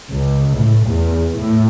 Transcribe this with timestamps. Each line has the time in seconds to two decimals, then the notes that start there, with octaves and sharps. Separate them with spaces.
0.11 C#2
0.58 A2
0.88 E2
1.38 A2